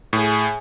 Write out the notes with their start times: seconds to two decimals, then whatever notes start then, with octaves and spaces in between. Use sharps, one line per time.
0.13 A2 G#4